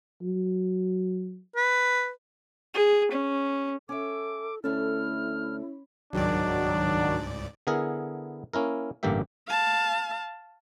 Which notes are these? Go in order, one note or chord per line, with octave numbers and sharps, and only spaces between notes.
F#3
B4
G#4
C#4
C#4 A4 E5 D6
D2 A3 C#4 E4 A4 C#5 B5 F6
C#2 G#2 D#3 F#3 D4 D5
D3 B3 E4 G#4 A#4
A#3 C#4 E4 A#4
A1 G2 D3 A#3 G4 E5
F5 A5